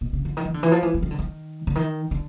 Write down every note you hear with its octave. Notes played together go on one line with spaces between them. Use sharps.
B2
C#3
D3
D#3
E3
D3
E3
F3
E3
E3
D#3
D3
D#3
D3
D#3
D3